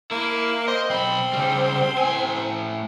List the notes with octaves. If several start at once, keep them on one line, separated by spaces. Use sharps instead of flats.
A#3 E4
C5 D#5
B1 C4 B5
C#3 G3
A2 G#5